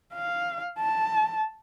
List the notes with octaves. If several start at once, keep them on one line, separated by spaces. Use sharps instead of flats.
F5
A5